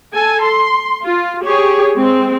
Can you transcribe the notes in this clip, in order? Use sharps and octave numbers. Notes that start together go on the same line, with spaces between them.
A4 G#5
C6
F4
G4 G#4 C#5
G#3 C4